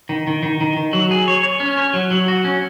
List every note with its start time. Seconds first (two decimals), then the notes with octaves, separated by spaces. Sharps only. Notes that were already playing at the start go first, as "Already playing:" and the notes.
0.09 D#3
0.27 D#3
0.43 D#3
0.61 D#3
0.77 D#3
0.93 F#3
1.11 G#4
1.28 C#5
1.43 C#5
1.60 C#4
1.77 C#5
1.94 F#3
2.11 F#3
2.28 F#4
2.45 C#4